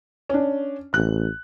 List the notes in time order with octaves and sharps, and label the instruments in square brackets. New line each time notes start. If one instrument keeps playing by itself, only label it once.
[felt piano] C#4 D4
[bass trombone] A1 [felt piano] F#6